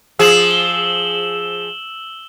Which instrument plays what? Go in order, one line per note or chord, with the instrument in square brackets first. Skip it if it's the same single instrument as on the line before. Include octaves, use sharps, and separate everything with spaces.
[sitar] F3 G#4 [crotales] E6 E7 F#7
[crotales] G7